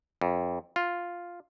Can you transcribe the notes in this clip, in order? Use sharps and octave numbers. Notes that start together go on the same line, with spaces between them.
F2
F4